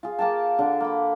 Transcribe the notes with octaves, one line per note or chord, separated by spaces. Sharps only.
F4 G#4
A#3 A#4 G5 A5
D3 D4 A4
A#3 B5